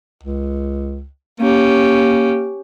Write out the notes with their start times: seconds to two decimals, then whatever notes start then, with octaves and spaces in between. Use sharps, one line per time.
0.23 C#2
1.40 A#3 C#4 G4